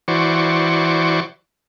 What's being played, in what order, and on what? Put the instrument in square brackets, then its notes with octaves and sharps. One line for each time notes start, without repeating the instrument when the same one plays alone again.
[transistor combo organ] E3 F#4 C5 D5 C#6